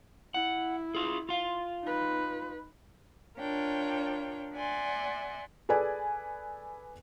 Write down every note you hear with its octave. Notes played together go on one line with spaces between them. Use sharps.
E4 F#5
F4 G#4
F4 F5
D#4 B4
D4 F4 A#4 C#5 G5
D5 E5 F#5 G#5 C6
G#4 A4 B4 D5 G#5